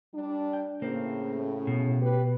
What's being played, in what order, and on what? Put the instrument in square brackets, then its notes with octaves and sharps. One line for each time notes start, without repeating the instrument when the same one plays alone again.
[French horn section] G3 D4
[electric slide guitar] G5
[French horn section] A2 C#3 [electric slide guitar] A#3 C4
[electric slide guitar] B2
[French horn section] G4 B4